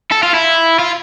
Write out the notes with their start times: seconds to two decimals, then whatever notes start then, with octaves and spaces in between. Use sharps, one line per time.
0.12 A4
0.23 F4
0.34 E4
0.79 F4